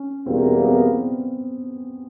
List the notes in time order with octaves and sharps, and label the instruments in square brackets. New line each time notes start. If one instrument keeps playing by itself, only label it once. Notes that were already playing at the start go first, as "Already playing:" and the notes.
Already playing: [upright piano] C#4
[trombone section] E2 B2 G3 A#3 [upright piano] C4
[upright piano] C4
B3